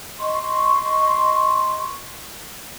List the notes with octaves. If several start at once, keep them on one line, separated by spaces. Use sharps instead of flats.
D#5 C6 C#6